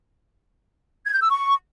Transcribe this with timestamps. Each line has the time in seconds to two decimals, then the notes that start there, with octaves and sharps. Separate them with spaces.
1.05 G#6
1.13 G6
1.21 E6
1.30 C#6